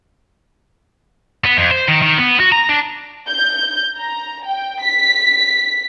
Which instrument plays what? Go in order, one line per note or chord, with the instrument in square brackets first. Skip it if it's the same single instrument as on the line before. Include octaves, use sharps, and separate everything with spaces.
[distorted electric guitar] B3
F2
C5
D#3
D#3
B3
F#4
A#5
D4
[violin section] G6
A#5
G5
B6